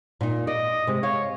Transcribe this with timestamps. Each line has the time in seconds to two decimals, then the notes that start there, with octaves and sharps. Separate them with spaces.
0.21 A#2 D#4
0.47 D5 D#5
0.87 C3 G#3
1.03 C#5 F5